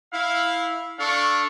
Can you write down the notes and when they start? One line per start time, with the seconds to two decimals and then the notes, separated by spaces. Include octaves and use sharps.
0.13 E4 F5
0.99 D4 A4 F5 C#6